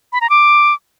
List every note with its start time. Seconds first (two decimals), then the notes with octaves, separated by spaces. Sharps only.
0.13 B5
0.21 A#5
0.30 D6